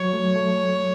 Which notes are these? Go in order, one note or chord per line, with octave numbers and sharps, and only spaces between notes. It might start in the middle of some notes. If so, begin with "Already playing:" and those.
Already playing: F#3 C#5
A3
A3